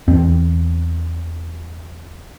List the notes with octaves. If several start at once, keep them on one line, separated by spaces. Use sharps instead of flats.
E2 C4